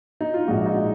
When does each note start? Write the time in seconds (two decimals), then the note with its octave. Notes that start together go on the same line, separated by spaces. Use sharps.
0.21 D#4
0.34 F4
0.47 A#1 G#2 F3 G#3 F#4
0.66 D#4